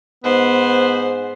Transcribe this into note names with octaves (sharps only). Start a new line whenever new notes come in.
G#2 B3 C5